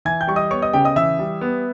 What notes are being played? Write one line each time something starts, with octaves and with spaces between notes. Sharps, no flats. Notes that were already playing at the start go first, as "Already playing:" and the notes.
E3 G#5 G#6
G5 G6
G3 C#6
D#5 D#6
B3 C#5 C#6
D#5 D#6
C#3 G4 G5
D#5 D#6
E3 E5 E6
G3
B3